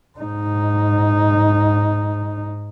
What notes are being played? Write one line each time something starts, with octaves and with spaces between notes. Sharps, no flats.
G#2 D#4